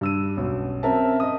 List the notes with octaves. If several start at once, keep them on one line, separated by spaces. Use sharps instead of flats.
G2 E6 D#7
B1 F#2
C4 C#4 A#4 E5 A5
D#5 D#6